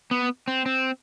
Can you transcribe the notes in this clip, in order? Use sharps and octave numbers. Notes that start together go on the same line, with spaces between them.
B3
C4
C4